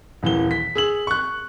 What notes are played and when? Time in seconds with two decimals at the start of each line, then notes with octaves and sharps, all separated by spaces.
0.23 D#1 E3 G7
0.51 B6
0.75 G#4 E6 F#7
1.07 C#6 F#6